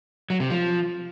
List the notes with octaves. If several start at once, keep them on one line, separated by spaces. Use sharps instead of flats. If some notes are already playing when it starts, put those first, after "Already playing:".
F#3
C3
F3